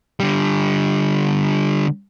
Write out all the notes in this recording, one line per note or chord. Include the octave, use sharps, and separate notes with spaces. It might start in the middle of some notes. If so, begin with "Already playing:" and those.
D3 G3